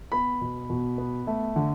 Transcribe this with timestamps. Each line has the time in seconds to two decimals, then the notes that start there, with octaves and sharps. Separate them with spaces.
0.12 B3 B5
0.41 B2
0.70 B2
0.98 B3
1.27 A3
1.56 D3